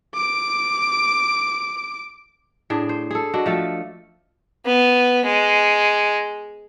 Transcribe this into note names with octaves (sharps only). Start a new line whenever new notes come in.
D6 D7
A2 D4 G#4
C5
G#4 A4
D4 F#4 D#5
F3 A3 A4
B3
G#3